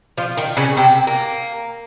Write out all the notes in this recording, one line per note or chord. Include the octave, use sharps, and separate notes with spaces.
F3 F4
D#3 D#4
C#3 C#4
C3 C4
A#3